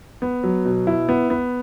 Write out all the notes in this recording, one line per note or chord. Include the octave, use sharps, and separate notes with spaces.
B3
F#3
B2
E4
B3
B3